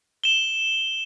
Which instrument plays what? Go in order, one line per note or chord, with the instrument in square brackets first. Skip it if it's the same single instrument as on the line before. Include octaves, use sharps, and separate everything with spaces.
[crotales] E7 G7